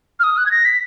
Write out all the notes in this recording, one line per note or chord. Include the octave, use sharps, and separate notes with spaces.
F6
D#6
F#6
G#6
A#6
B6